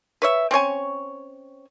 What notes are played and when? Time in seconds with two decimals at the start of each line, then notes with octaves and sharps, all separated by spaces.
0.22 B4 C#5 E5
0.51 C4 C#4 C#5 G#5